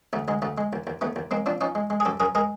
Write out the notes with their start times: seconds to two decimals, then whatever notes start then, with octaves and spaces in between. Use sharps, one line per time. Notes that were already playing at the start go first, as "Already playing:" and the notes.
0.13 D2 A3
0.28 D2 G#3
0.42 D2 A3
0.58 G#3
0.73 D#2
0.87 D#2
1.01 D#2 A3 B3
1.16 D#2
1.31 G#3 A#3 C4
1.46 F3 C4 D4
1.61 F3 C#4 D#4
1.75 G#3
1.90 G#3
2.00 G#4
2.05 F#2 G4 A4
2.20 F#2 G#4 A#4
2.35 G#3 G#4 A#4